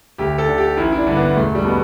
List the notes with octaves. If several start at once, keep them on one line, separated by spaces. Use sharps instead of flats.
D2 G4
A4
D3
G4
A1 E4
E4
D4
G2 D3
B3
E1 A3
G3
B2 B3